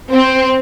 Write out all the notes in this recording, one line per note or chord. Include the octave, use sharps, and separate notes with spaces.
C4